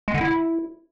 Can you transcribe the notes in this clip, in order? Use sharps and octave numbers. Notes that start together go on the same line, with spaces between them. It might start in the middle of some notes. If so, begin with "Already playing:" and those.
G#3
D3
E4